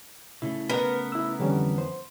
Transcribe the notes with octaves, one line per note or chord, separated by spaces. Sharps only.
C#3 A3 E4
B3 A#4 B4
E4 E6
F2 D3 E3 G3 C#4
C5